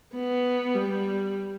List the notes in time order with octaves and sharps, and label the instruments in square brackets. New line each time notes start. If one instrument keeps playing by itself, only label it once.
[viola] B3
G3